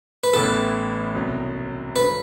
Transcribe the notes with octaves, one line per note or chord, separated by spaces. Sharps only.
B4
A1 A2 E3 B3 E4 A4
C2 B2 F#3
G2 D3 F#3 B4